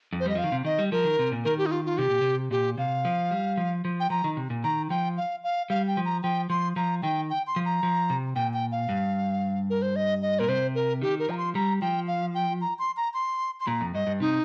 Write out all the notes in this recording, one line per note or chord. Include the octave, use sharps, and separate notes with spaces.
F2
C5
G3 D#5
F3 F5
D#3
C3
D#3 D#5
G3
F3 A#4
D#3
C3
A#2
D#3 A#4
G4
D#4
F4
F4
C3 G4
A#2
C3
A#2 G4
C3 F5
F3
G3
F3
F3
G5
F3 A#5
D#3
C3
A#2
D#3 A#5
F3 G5
F5
F5
G3 F5
G5
F3
A#5
F3 G5
F3 C6
F3 A#5
D#3 G5
G5
C6
F3
A#5
F3
C3
A#2 G5
G5
F5
G2
A#4
C5
D#5
D#5
A#2 A#4
C3 C5
A#4
D#3 G4
A#4
F3 A#5
C6
G3 A#5
F3 G5
F5
G5
A#5
C6
A#5
C6
C6
A#2 A#5
F2
G2 D#5
G2
C3 D#4